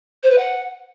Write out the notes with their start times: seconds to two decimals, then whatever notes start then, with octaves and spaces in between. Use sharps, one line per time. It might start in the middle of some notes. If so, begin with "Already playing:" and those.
0.23 C5
0.31 B4
0.38 F#5